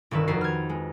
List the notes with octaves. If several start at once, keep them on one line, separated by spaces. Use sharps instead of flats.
G1 C2 D#3 B4 E6
F2 D#4 F#4 B4 C7
F6 G#6
G#3